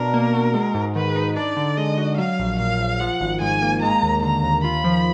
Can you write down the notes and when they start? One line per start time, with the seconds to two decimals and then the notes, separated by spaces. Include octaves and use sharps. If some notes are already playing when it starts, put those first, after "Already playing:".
Already playing: B2 D4 A#4
0.14 A#3
0.34 F#4
0.54 G#3
0.75 G#2
0.95 D#3 B4
1.16 D#4
1.36 D4 D5
1.57 D3
1.77 G#3 D#5
1.98 F#4
2.18 F#3 F5
2.39 A#1
2.59 A#2 F5
2.79 A#1
3.00 F3 F#5
3.21 G#1
3.41 G#2 G#5
3.62 A#3
3.82 G#3 A#5
4.03 D#2
4.23 D3 A#5
4.43 D#2
4.64 F4 B5
4.84 F3